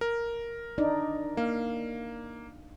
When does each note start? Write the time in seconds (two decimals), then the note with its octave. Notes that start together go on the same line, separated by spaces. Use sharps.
0.01 A#4
0.78 D4 D#4 D5
1.37 A#3 F5